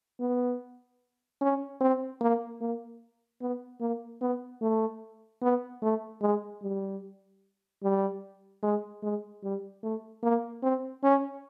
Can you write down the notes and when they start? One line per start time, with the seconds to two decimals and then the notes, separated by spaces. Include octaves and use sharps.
0.20 B3
1.41 C#4
1.81 C4
2.21 A#3
2.61 A#3
3.41 B3
3.81 A#3
4.21 B3
4.62 A3
5.42 B3
5.82 A3
6.22 G#3
6.62 G3
7.83 G3
8.63 G#3
9.03 G#3
9.43 G3
9.83 A3
10.23 A#3
10.63 C4
11.03 C#4